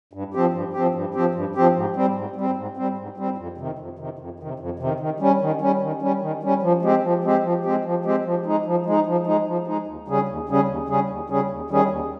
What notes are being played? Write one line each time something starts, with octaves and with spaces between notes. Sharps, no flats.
G2
F3 C4 G4
G2
F3 C4 G4
G2
F3 C4 G4
G2
F3 C4 G4
G#2
G3 C4
G#2
G3 C4
G#2
G3 C4
G#2
G3 C4
F2
C3 D#3
F2
C3 D#3
F2
C3 D#3
F2
C3 D#3
D#3
G3 C#4
D#3
G3 C#4
D#3
G3 C#4
D#3
G3 C#4
F3
G#3 C4 G4
F3
G#3 C4 G4
F3
G#3 C4 G4
F3
G#3 C4 G4
F3
G#3 D#4
F3
G#3 D#4
F3
G#3 D#4
F3
G#3 D#4
D#2
C#3 G3 C#4 G#4
D#2
C#3 G3 C#4 G#4
D#2
C#3 G3 C#4 G#4
D#2
C#3 G3 C#4 G#4
D#2
D#3 G3 C#4 G#4
D#2